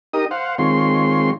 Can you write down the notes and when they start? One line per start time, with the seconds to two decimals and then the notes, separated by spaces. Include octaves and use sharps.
0.13 D#4 G4 A#4 D#5 D#6
0.31 C5 F5 F#5
0.58 D#3 G#3 C4 F4 C#5 C6